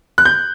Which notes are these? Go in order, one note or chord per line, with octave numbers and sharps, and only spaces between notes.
F#6
G6